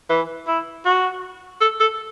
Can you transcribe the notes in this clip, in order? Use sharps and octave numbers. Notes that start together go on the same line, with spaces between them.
E3
E4
F#4
A4
A4